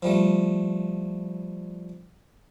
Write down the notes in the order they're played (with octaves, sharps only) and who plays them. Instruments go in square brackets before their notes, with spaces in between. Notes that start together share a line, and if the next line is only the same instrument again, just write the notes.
[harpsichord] F3 G3 A3